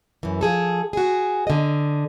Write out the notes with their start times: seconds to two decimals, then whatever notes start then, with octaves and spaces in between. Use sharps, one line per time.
0.23 F#2 E3
0.41 F3 G#4 A4
0.93 F#4 G#4
1.47 D3 D#5